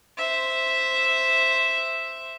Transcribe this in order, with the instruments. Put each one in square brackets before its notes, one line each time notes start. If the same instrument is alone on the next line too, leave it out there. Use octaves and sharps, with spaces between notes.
[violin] C5 E5